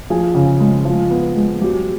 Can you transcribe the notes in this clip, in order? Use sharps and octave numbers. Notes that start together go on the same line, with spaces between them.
F3 G#4
C#3
G#3
F3
B3
G#3
F#3 G4